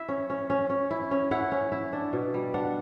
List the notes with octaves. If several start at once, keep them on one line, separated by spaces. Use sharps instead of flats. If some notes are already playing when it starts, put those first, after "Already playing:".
Already playing: E4 E5
C#4
C#4
C#4
C#4
E4
C#4
E4 F#5
C#4
E4
D4
B2
G3
D4 F#5